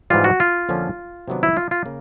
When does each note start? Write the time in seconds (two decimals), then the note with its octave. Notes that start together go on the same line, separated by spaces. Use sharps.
0.10 G#2 E3 G3 F4
0.24 F#4
0.40 F4
0.69 F2 D3 F3 A#3 C#4
1.28 C3 D#3 F#3 B3 D4
1.43 E4
1.57 F4
1.71 F4
1.86 C#3 A#3